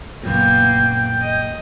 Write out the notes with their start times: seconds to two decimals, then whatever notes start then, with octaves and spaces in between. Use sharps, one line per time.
0.24 C#2 F#2 A#2 A#3 B3 G5
1.20 D#5